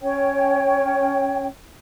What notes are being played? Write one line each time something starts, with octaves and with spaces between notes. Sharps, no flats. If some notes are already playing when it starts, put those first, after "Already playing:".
C#4 C#5 G5